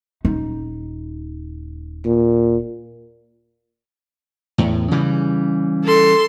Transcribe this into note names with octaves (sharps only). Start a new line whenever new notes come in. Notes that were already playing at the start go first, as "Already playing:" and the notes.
D#1 D#4
A#2
E2 A2
C#3 E3 G3
A4 C6